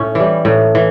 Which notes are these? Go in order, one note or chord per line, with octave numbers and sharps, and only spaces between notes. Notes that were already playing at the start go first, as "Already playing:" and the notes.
Already playing: A2 C#4
E3 G3
A2
E3